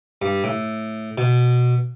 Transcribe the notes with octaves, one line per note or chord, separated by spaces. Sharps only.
G2
A2
B2